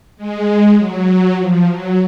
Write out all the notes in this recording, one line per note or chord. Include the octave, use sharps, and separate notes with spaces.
G#3
F#3
F3
F#3